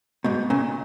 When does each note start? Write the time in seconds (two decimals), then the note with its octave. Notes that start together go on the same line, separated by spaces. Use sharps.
0.24 G#2 B2
0.50 A#2 C#3